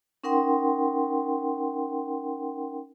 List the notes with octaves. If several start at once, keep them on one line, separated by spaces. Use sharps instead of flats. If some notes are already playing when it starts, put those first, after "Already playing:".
C#4 D#4 A#4 F#5 G5 C6